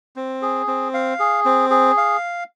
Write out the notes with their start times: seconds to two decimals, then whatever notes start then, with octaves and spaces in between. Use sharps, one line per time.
0.16 C4
0.42 G#4
0.68 C4
0.94 F5
1.20 G#4
1.45 C4
1.71 G#4
1.97 F5